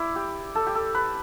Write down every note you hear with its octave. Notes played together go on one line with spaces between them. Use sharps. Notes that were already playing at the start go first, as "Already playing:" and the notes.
Already playing: E4 D5
G4
A4
G4
A4
B4